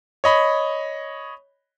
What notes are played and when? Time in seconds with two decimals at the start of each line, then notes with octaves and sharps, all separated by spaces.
0.24 C#5 D#5 B5